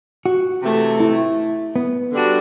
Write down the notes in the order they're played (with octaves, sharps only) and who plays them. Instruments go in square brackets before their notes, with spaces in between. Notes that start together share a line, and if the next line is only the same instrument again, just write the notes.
[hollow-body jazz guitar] F#4
[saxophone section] C3 E3 A3
[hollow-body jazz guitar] E4
B3
[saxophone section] D3 G3 D4 F#4